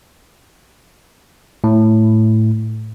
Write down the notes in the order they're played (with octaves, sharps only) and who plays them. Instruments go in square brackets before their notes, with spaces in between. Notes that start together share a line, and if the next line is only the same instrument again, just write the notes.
[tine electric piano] A2